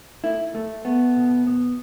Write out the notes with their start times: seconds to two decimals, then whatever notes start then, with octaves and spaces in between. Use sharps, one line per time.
0.24 A3 E4
0.55 A3
0.85 A3 B3
1.16 B2
1.47 B3